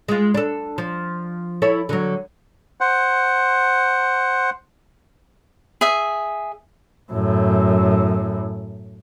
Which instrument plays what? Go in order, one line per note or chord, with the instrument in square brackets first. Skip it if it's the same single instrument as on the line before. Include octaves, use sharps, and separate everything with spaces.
[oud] G#3 F4
D4 A4
F3
E4 A4 C#5
D3 F#3
[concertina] C5 F#5
[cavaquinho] G#4 E5
[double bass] F#2 A2